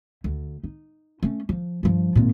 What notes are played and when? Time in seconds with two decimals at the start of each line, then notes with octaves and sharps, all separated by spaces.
0.24 D2
0.63 D#4
1.23 A3 C#4
1.49 F3
1.83 G2 F3
2.15 G#1 A#2